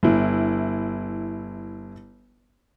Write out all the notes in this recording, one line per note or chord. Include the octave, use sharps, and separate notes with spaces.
G1 E4